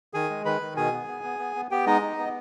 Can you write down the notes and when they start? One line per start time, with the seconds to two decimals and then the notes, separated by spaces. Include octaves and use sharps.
0.13 D#3 G#4 G#5
0.30 G#3
0.45 D#3 B4 B5
0.61 D#3
0.76 B2 G#4 G#5
0.93 B3
1.08 B3
1.24 B3
1.39 B3
1.56 B3
1.71 B3 G4 G5
1.86 G#3 D#4 D#5
2.02 D#4
2.18 B3